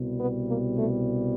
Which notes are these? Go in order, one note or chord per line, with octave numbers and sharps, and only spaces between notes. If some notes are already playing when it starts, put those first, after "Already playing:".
Already playing: C2 B2 G3
B3
A#3
A3